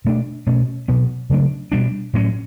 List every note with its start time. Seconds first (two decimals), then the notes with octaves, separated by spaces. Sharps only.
0.05 B2 A3 D4
0.47 B2 A3 C#4
0.88 B2 F#3 B3
1.30 C#3 F#3 A3 D4
1.72 B2 G3 D4
2.14 A2 F#3 C#4